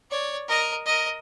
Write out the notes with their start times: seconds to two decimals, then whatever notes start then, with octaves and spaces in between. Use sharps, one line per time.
0.11 C#5 D5
0.48 A#4 D#5
0.86 A#4 D#5